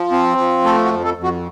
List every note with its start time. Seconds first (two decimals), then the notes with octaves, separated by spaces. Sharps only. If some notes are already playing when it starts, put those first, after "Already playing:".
Already playing: F3
0.11 C4
0.38 F3
0.64 A3 A4
0.84 F#4
0.91 F2
1.04 A4
1.17 F2
1.23 F#4